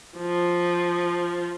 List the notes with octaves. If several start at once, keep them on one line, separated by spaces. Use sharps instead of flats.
F3